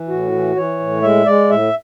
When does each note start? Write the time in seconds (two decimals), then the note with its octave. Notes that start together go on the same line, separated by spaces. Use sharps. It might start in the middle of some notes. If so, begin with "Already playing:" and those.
Already playing: E3
0.09 A2 F#4
0.32 E3
0.56 E3 C#5
0.79 A2
1.02 G#3 E5
1.26 G#3 D5
1.50 A2 E5